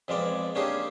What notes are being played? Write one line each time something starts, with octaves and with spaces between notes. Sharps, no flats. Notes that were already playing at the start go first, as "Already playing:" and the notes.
F2 F3 G#3 B3 D5
A#3 C#4 D4 G4 G#4 C5